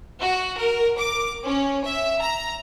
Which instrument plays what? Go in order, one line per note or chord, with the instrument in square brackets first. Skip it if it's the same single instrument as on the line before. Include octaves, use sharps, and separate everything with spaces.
[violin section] F#4
A#4
D6
C#4
E5
A#5